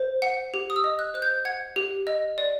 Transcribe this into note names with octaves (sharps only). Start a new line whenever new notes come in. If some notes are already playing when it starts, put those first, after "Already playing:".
Already playing: C5
F#5
G4
D#6
E6
D#5
F#6
C5 F#6
G6
F#5 G#6
G4
D#5
D5